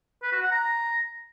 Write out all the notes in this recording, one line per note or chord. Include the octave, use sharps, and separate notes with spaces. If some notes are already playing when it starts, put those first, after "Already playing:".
B4
F#4
F#5
A#5